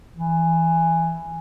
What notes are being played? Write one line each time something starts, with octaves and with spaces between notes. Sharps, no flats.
E3